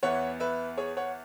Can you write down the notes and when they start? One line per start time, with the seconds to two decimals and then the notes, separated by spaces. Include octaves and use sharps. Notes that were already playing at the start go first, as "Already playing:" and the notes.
0.03 E2 E3 B3 C#5 F#5
0.40 B4 E5
0.77 G#4 C#5
0.97 C#5 F#5